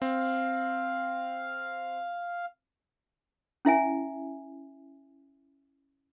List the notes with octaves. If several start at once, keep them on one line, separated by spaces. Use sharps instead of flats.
C4 F5
C#4 E4 E5 G#5